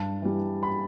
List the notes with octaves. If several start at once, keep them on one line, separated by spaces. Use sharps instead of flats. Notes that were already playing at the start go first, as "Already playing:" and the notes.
Already playing: G2 A5
E3 G3
B5